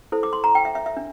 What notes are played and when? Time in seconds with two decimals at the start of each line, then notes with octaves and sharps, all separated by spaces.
0.12 E4 A4 C5
0.23 D6
0.33 C6
0.44 A#5
0.55 G5
0.65 E5
0.75 E5
0.86 E5
0.97 D4